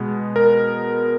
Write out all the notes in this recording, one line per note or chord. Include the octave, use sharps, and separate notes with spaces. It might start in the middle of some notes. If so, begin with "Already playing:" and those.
Already playing: B2 G#3 B3
A#4